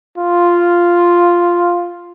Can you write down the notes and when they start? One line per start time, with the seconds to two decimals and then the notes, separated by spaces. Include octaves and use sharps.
0.18 F4